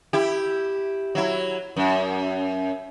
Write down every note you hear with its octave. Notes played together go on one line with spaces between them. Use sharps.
E4 G4
F#3 E4
F#2